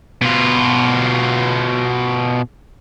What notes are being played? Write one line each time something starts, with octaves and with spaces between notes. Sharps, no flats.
B2 F4